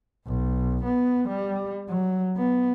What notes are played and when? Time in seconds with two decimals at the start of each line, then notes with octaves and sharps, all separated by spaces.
0.27 B1
0.84 B3
1.29 G3
1.89 F#3
2.37 B3